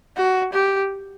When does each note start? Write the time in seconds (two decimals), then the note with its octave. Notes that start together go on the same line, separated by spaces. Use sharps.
0.17 F#4
0.53 G4